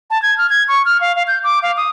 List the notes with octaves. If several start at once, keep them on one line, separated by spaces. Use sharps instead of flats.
A5
G#6
F6
G#6
C#6
F6
F5
F5
G6
D6
F5
D#6